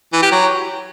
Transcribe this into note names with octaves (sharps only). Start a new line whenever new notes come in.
E3
G4
F#3